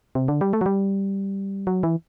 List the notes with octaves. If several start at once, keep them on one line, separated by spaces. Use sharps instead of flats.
C3
D3
G3
A3
F#3
G3
F#3
E3